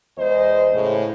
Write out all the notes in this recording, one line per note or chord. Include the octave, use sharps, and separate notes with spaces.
E2 G#3 C5 D#5
A2 C#3